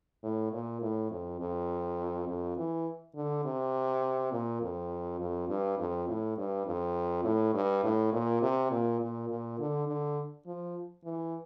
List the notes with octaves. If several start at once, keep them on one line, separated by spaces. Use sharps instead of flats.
A2
A#2
A2
F2
F2
F2
E3
D3
C3
A#2
F2
F2
G2
F2
A2
G2
F2
A2
G2
A2
A#2
C3
A#2
A#2
A#2
D3
D3
F3
E3